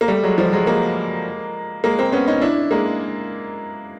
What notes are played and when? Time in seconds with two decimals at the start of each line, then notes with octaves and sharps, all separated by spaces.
0.01 A#3
0.08 G3 A3
0.23 F#3 G#3
0.38 F3 G3
0.52 F#3 G#3
0.67 G#3 A#3
1.84 G#3 A#3
1.99 A#3 C4
2.12 B3 C#4
2.28 C#4 D#4
2.42 D4 E4
2.71 G#3 A#3